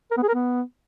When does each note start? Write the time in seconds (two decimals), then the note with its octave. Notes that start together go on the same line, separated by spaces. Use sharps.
0.11 A#4
0.17 B3
0.23 G#4
0.29 A#4
0.34 B3